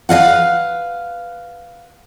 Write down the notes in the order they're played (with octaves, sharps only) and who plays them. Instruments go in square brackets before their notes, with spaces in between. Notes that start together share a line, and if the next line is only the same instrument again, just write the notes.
[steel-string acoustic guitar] B4 D#5 F5 F#5